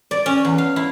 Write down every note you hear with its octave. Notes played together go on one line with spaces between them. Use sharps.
D5
C#4
E2
F5
E4